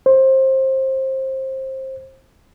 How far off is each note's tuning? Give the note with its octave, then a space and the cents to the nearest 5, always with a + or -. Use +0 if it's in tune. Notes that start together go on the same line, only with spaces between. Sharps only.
C5 +20